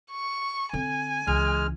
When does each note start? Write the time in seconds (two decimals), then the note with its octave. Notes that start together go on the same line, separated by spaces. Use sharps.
0.11 C#6
0.73 D3 C4 G#5
1.27 C#2 E3 G#3 F6